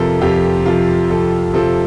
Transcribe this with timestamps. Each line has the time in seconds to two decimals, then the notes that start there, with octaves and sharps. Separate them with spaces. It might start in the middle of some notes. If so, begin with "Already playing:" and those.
Already playing: F2 C3 F3 A4 A#4
0.21 F2 G4
0.65 C3 F3 F4
1.10 F2 A4
1.53 C3 F3 A4